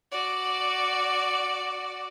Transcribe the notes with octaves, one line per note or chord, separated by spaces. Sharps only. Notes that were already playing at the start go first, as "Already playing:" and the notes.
F#4 D5